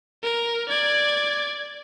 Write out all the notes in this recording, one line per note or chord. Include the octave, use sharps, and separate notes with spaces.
A#4
D5 G#6